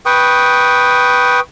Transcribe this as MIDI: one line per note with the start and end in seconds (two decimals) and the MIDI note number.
0.06 1.40 71
0.06 1.40 79
0.06 1.40 85
0.06 1.40 87